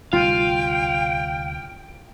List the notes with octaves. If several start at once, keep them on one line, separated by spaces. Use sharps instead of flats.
D2 C3 G3 F4 F5 G5 D#7